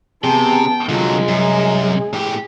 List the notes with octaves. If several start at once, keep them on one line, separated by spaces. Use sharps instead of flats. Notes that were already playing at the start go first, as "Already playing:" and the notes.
C3 B3 G#4 G5 A5
C2 D3 F#3 G#3 F4 F#4
F#2 G#4
A2 G4